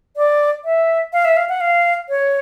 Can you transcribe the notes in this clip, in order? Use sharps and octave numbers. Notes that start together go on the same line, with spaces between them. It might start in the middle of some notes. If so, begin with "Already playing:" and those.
D5
E5
F5
E5
F5
F#5
F5
C#5